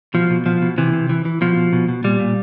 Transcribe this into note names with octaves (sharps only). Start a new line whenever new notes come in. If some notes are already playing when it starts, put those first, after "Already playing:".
B2 F3
B2
B2 F3
B2
C3 E3
C3
E3
E3
B2 F3
B2
B2
B2
A#2 G3
A#2